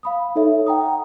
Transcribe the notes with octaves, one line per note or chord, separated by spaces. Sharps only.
F5 B5 D#6
D#4 A4 C#5 E5
F#5 G5 A#5 D#6